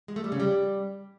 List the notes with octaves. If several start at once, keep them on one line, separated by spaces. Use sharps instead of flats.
G#3
A3
G3
C#3
G3